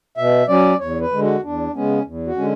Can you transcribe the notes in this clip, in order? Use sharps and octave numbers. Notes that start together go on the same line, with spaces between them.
B2 E5
F#3 C#4 D5
E2 C#5
B4
D3 G#3
F#4
E2 D4
C#3 G#3 B3 C#4
E2
F#4
D3 G#3 C#4